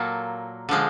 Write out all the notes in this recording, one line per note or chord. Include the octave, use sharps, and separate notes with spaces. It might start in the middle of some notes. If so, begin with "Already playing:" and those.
Already playing: A#2 F#3 A#3 A4
D3 F3 G#3